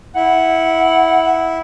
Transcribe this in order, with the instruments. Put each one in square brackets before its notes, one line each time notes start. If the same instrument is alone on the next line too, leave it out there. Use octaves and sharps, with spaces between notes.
[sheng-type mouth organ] E4 [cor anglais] F#5